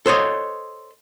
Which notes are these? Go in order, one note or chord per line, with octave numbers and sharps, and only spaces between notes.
A4 C5 C#5 D#5